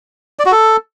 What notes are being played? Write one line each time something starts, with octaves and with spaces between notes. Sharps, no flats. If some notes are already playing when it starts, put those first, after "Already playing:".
D5
F#4
A4